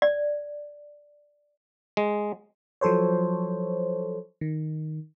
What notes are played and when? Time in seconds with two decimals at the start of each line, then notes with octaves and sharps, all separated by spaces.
0.02 D5
1.97 G#3
2.81 F3 F#3 A4 C5 C#5
4.41 D#3